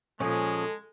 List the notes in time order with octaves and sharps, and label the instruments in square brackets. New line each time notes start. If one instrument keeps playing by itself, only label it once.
[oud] A#2 F3 [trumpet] G#3 [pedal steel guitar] C#4 G#4 [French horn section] A4